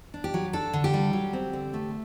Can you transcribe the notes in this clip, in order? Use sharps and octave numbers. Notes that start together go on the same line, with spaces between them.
D4
G4
F#3
D4 A4
D3
G4
G3
F#3
C4
D3
A3